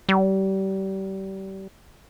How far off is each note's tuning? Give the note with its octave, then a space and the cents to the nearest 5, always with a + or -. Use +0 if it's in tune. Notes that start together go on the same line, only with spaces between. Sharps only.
G3 -30